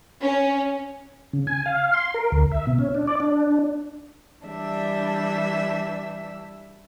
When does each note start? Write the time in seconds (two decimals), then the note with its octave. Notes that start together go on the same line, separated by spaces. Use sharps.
0.21 C#4
1.33 C#3
1.47 G#5
1.66 F5
1.94 C6
2.14 A#4
2.32 D2
2.52 E5
2.67 B2
2.79 C#4
2.95 D4
3.07 D5
3.20 D4
4.45 E3 G3 D4 E5